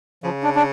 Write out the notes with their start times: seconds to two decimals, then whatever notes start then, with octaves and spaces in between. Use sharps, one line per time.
0.24 C#3 F3
0.43 D4
0.55 D4